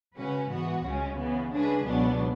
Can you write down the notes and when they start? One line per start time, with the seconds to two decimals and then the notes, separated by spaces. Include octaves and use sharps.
0.16 C#3 G#3 C#4 F#4 B4
0.50 G#2 E3 G#3 B3 F#4
0.83 C#2 C#3 G#3 C#4
1.18 C#3 E3 B3
1.51 C#3 G#3 D4 G#4 B4
1.85 C#2 B2 F#3 B3 D4